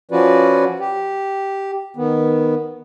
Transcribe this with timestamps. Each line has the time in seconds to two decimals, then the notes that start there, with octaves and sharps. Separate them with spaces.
0.11 F3 C#4 F4 F#4 B4 D5
0.80 G4
1.96 D#3 B3